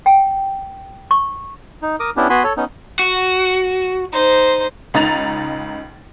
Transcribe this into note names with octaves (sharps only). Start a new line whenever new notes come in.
G5
C#6
D#4
A#4 A#5 D6 D#6
B3 C#4 D4 E4 G4
B3 F#4 G#5 B5 C6
A4 C#5
B3 C#4 D#4
F#4
D#4 C5
C#2 D#4 A#5 A6 F7